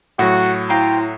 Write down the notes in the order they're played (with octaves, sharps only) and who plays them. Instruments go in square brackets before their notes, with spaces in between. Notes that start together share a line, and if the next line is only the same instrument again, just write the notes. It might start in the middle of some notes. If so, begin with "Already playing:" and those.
[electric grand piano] A2 F#3 [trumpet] F#4 [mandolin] F#5
[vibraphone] E4 [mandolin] F4 C5 G5 [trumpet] A#5